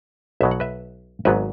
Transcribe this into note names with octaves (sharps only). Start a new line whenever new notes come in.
B1 B2 F#3 E5
F#5
B4 E5
G#1 G#2 F#3 B3 B4 E5